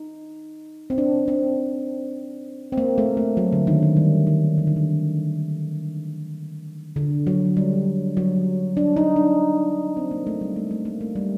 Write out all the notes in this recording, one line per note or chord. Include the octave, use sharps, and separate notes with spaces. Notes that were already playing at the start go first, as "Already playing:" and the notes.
Already playing: D#4
C4
D4
C4
C4
A#3
A3
A3
F#3
D3
D#3
D#3
G3
D#3
D3
D#3
D3
D3
F#3
G3
F#3
D4
D#4
D4
C4
A#3
A3
G3
A3
A3
A#3
A3
G3